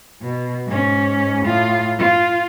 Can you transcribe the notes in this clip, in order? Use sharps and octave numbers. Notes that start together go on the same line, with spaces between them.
B2
G#2 C#4
A2 F4
F4